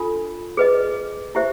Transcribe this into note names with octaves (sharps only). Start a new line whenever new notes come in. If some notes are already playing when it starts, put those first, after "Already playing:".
Already playing: D4 F4 A4
G#4 B4 D#5
E4 G4 C5 E5